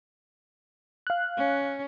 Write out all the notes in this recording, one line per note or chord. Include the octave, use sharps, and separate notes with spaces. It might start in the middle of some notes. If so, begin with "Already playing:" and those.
F5 F#6
C#4